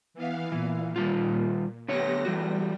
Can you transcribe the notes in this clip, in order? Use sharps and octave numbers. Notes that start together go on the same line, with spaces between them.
E3 B3 F5
A#2 E3
D#3 G3 F4
D3 A3 B3 G4 C#5 A#6
E3 G3 A3 F#4